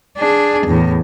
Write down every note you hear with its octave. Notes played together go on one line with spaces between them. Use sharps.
D4 G#4
E2 A2